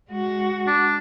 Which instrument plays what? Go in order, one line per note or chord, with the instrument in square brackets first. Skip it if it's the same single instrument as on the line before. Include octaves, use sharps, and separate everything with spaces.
[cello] G#3 F#4
[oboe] D4